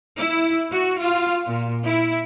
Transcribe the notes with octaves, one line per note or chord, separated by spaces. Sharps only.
E4
F#4
F4
A#2
E4